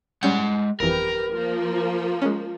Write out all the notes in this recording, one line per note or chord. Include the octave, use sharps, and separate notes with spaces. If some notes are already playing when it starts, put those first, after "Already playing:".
G3 G#3 C#4 F#5 G6
G1 F2 E3 G4 A#4 B4
F3 A#3
G#3 C#4